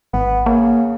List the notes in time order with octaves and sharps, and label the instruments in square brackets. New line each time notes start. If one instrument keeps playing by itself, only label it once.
[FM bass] G#1 [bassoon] B3
[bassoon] C#3 [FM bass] A#3